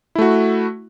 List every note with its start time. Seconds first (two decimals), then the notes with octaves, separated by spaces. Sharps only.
0.15 E4
0.18 A3
0.22 F#4